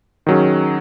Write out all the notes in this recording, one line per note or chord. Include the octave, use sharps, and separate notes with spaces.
D#3 F#3 C#4 G#4